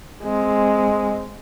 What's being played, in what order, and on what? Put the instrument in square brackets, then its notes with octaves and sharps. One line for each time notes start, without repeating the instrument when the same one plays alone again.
[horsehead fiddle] G#3 C4